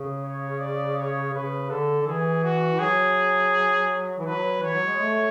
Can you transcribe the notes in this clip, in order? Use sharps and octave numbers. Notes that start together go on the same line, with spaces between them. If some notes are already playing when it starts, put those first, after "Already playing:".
Already playing: C#3
C#5
D5
C#5
C#3 B4
D3 A4
D3
E3 G#4
F#4
E3
F#3 G#4
E3
F#3 B4
E3 C#5
F#3
G#3
A3